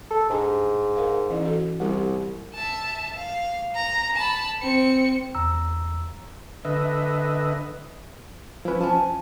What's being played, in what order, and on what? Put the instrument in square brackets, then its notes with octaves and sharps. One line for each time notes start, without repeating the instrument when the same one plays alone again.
[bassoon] A4
[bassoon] G#2 [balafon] D4 G4 G#5
[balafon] A#4 F5
E3 C#4 E4
F#4 A4
[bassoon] C2 [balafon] G3 E4 G4
[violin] E5 A5
F5
A#5
A5 B5
C4 C#7
[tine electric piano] E2 A#5 E6
[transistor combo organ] D3 B4 D#5 E5
[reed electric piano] F3 B4 [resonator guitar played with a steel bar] C#4 E4
[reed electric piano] F3 [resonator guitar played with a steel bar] C#4 G#5 A5